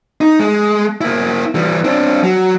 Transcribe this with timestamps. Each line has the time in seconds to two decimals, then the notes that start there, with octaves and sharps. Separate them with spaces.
0.21 D#4
0.40 G#3
1.01 A#3 E4
1.55 E3 G3
1.84 C4 D4
2.23 F#3